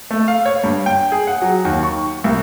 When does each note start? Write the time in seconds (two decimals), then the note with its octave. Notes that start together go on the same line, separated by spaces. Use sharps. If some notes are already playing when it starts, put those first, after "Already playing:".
0.11 A3
0.28 F5
0.46 C#5
0.64 G2
0.86 G5
1.12 G#4
1.27 F#5
1.42 F#3
1.65 D#2
1.83 C#6
2.24 C2